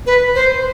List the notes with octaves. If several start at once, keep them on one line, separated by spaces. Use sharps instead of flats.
B4
C5